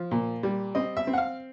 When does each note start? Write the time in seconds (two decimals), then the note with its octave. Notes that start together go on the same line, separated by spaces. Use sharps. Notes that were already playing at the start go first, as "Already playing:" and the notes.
Already playing: F3
0.11 A#2
0.43 G3
0.75 C4 D#5
0.97 E5
1.07 C4
1.13 F#5
1.18 F5